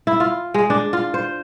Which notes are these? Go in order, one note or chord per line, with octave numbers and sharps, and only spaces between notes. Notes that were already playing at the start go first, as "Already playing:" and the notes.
E4
F4
G#3
D4
F4
C5